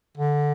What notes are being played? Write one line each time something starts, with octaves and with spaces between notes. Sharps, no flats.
D3